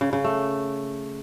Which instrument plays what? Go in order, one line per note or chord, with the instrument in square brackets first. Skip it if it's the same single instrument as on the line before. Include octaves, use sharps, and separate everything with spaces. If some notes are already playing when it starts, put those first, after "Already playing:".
[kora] C#3
C#3
A3